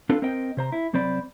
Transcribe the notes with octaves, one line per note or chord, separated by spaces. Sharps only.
C4 D4 F4 A4 B4
C4 A#4 C5 D#5 G5
C3 C5 A#5
E4
C2 F#3 C4 C5 D5 B5